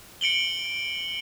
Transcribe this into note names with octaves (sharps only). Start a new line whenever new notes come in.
C#7 D7 F#7 G7